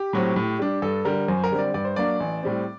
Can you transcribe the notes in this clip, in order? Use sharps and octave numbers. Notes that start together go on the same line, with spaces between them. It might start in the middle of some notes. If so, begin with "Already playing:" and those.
Already playing: G4
A2 F#3 C4
A2
G3 D4
G2 A4
D3 G3 A#4
F#2 C5
A#4
D3 G3 C4
D5
G2 D5
C5
F#3 A#3 D4 D5
A1
A2 G3 C4